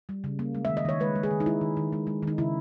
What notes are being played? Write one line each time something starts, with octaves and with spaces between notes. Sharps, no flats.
G3
C#3
A#3
G#3
D#3 E5
D#5
D#3 C#5
G#3 B4
G#3
G#4
D#3
D#4
G#3 E4
D#3
D#3
G#3
G#3
D#3 D#4
C#3 E4